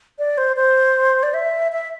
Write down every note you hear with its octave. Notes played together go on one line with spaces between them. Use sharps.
D5
C5
C5
D5
E5
E5